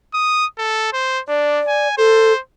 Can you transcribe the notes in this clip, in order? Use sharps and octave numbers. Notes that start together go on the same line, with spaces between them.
D#6
A4
C5
D4 D5
G#5
A4 C5